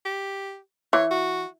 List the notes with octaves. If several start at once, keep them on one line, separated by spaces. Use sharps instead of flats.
G4
E3 C#5
F#4